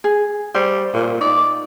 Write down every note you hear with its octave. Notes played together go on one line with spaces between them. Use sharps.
G#4
G3 C5
A#2
D#4 D5